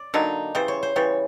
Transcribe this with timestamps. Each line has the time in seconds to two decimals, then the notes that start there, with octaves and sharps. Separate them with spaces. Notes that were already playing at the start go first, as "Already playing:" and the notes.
Already playing: D5
0.14 D3 F#3 A#3 D#4
0.55 C#3 E3 G3 C5
0.68 C#5
0.83 C5
0.96 C#3 E3 G3 C#5